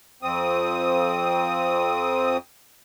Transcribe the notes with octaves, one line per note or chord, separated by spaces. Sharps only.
F2 C4 D#6